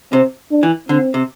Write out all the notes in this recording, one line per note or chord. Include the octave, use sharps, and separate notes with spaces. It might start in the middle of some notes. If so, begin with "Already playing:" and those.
C3 C4
D4
E3
D3 C4
C3